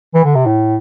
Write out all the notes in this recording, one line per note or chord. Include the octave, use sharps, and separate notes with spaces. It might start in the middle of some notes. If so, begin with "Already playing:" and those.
E3
D3
C3
A2